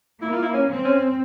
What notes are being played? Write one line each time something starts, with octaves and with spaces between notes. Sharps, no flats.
A#3 E4
F4
E4
C#4
C4
C#4